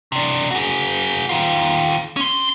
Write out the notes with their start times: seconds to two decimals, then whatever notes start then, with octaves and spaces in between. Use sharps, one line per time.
0.12 C3 D4
0.51 F#4 G#4
1.29 D#3 F4
2.16 C#4 C6